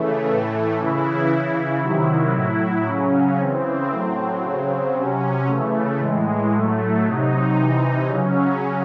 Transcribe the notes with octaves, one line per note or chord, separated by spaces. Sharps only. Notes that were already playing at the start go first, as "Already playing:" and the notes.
Already playing: C#3 E3 A3
A2 E3 A3
C#3 E3 E4
C#3 E3
C3 D#3 F#3
A2 F#3 E4
C#3 F#3 C#4
C#3 E3 C4
A2 F#3
C#3 F#3
C3 F#3 C#4
C#3 E3 A3
A2 E3 G#3
A2 F#3 A3
C3 F#3 D#4
C3 E3 D#4
C#3 F#3 C#4